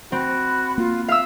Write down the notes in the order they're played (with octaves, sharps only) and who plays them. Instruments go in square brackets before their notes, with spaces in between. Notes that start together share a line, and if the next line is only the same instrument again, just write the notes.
[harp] C4 [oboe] F#4 [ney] B5
[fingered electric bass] A#3 [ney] F4
[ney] E5 [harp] F5 E6